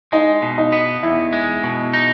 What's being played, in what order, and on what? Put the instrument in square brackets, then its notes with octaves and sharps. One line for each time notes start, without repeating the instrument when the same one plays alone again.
[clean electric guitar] G#3 [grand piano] D#4
[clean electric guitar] B2
[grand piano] D#4
[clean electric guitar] B3
[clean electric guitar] E2 [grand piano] E4
[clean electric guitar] G#3
B2
D#4